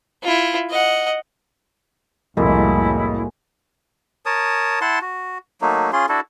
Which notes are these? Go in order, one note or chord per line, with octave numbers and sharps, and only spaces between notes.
E4 F4
D#5 F#5
C2 F2 A2 G3 G#3 A#3 E4 F#4
A#4 C#5 A5 D#6
E4 F#5 A5 C6
F#4
F#3 A3 A#3 D#4
C#4 F4 G#4 C6
D4 E4 F#4 A4